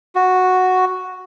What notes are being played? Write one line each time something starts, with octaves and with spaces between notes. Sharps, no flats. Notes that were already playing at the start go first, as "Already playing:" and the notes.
F#4